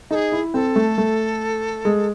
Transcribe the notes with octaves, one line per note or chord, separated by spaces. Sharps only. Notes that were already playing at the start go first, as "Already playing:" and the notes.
D#4 G#4 A4
E4
C4 A4
A3
A3
G#3